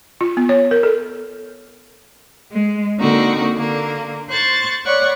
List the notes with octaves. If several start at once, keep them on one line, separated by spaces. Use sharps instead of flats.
F4
B3
C#5
A#4
A4
G#3
D3 A#3 C4 D#4 F#4 A#4
D3 A#3
C5 C#6 F#6 A6
C#5 D5 F#5 B5 C#6